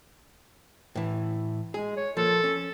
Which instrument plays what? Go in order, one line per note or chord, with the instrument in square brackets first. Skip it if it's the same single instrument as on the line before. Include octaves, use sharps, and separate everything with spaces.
[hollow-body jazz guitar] A2 E3
[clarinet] G#3 [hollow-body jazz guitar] G#4
[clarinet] C#5
[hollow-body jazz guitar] F3 A#3 [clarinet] A4
[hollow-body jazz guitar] C#4